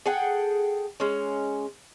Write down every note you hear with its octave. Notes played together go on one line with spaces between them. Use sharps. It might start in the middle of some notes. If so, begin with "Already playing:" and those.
G#4 A4 F#5 G5
G#3 C#4